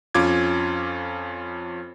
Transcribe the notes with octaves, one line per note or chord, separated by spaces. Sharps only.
F2 C#4 F4 D6 G#6